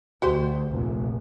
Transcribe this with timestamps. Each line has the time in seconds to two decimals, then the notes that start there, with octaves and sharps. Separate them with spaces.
0.22 D2 F#4 G4 C5
0.71 F1 A#1